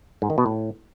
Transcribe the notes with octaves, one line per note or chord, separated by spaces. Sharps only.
G#2
D#3
B2
A2